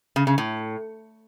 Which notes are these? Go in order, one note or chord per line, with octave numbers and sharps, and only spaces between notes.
C#3
C#3
A2